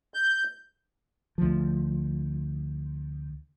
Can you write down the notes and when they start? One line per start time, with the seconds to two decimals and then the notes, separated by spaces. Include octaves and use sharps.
0.14 G6
1.38 D2 F3